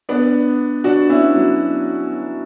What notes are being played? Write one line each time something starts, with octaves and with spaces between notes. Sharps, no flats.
B3 D4
D4 F#4
C#4 E4
F#3